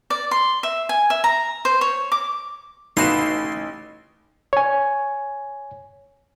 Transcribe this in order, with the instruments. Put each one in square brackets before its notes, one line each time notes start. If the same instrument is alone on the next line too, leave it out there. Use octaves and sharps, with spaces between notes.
[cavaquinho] D5
C6
E5
G#5
E5
A#5
C5
C#5
D6
[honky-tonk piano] A1 C7 E7 [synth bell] D#4 [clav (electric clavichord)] F#4 B4 F5 [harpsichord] C6
[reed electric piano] C#5 G#5